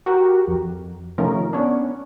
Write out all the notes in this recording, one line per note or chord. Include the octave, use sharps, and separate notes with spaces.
F#4 G4 A#4
F2
C3 D#3 F3 A3 C#4 A#4
B3 C#4 D4